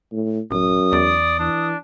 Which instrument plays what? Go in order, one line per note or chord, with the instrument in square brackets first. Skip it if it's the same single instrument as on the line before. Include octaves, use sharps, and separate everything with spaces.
[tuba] A2
[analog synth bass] D1 [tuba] F#2 [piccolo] D#6
[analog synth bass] E2 [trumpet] D5
[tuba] E3 [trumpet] D4